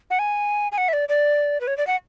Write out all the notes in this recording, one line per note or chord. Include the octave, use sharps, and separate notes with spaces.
F#5
G#5
G#5
F#5
E5
D5
D5
B4
C#5
D5
F#5